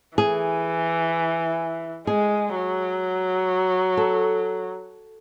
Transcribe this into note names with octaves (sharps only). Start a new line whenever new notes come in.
E3 G#4
G#3 G#4
F#3
A4